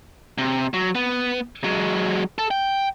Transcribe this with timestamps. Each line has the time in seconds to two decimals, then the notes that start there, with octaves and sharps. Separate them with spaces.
0.38 C3
0.74 F#3
0.95 B3
1.64 F#3 G#3
2.38 A4
2.51 G5